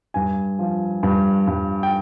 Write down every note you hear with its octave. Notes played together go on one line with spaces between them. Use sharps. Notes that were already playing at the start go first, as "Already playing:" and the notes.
G2 G#5
F3
G2
G2
G5